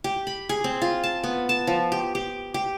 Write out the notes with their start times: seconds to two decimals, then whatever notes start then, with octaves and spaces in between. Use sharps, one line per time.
0.04 G4
0.27 B5
0.49 G#4
0.64 C4
0.82 F4
1.04 A5
1.23 B3
1.49 A5
1.67 F3
1.92 G4
2.15 G4
2.54 G4